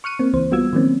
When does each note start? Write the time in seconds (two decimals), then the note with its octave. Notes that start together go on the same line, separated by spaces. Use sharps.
0.04 C#6 F6 F#6 C#7 D#7
0.19 A#3 C4
0.34 C#2 E3 C5
0.51 G3 B3 F4 F#4 E6 G#6
0.73 D#3 F3 F#3 A#3 C4 C#4